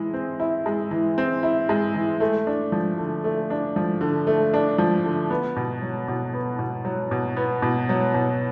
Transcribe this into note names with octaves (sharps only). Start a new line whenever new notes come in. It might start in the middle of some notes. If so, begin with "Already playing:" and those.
Already playing: E3 G#3 E4
C4
E4
G#3
E3
C4
E4
G#3
E3
A3
D4
F3
D3
A3
D4
F3
D3
A3
D4
F3
D3
B3
B2
F#3
B2
B3
B2
F#3
B2
B3
B2
F#3
B2